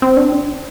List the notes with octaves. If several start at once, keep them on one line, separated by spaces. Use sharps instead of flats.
C4
D4